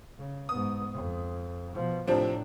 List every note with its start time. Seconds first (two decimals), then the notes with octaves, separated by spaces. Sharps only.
0.18 C#3
0.49 G#2 B3 D#6
0.94 F2
1.74 B2 F3
2.08 A2 C3 F3 C4 D4